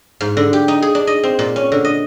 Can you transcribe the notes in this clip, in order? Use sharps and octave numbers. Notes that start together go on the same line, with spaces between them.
G#2
D3
G4
D#4
G#4
D4
D#5
C4
A#2
C#4
D3
D#5